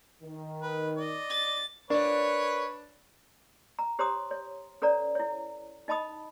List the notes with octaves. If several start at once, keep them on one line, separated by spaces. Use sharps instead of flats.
D#3
B4
D5 D#5
A6
D4 A#4 B4 C#5 D5
A#5
G4 C5 C#5 A#5 C6 D#6
C#5
C#4 A4 B4 C#5 D5 A#5
E4 C#5
D#4 D#5 A5 B5 D#6